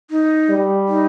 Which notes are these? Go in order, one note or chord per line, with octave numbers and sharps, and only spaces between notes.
D#4
G3
D#4